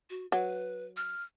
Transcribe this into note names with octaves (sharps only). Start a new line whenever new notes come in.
F#4
F#3 B4
F6